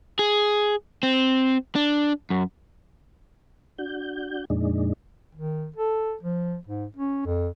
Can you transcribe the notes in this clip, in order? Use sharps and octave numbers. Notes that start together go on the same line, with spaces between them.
G#4
C4
D4
F#2
D4 F#4 G6
F2 A#2 G#3 D4 D#4
D#3
A4
F3
G#2
C#4
F2